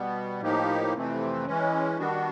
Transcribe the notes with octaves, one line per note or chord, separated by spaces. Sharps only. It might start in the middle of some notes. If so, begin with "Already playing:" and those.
Already playing: B2 G3 B3
A2 F3 A#3 D#4 G4
F2 C3 E3 A3 C4
E3 G#3 C#4
D#3 G3 B3 D4 F#4